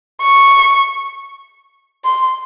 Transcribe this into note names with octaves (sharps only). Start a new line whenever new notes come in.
C#6
C6